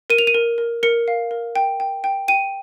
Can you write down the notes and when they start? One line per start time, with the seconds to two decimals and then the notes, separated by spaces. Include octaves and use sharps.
0.10 A#4 D#7
0.19 F7
0.27 D#7
0.35 A#4
0.58 A#4
0.83 A#4 C#7
1.08 F5
1.31 A#4
1.56 G5
1.80 G5
2.04 G5
2.28 G5 D#7